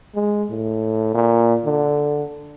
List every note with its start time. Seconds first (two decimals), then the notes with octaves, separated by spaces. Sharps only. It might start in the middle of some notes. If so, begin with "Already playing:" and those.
0.15 G#3
0.50 A2
1.15 A#2
1.65 D3